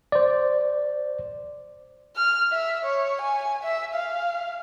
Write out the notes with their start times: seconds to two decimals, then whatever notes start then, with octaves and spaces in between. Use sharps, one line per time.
0.12 C5 D5
2.16 F6
2.53 E5
2.85 C#5
3.22 G#5
3.63 E5
3.94 F5